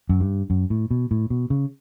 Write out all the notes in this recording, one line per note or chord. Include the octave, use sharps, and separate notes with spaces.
F#2
G2
F#2
A2
B2
A2
B2
C#3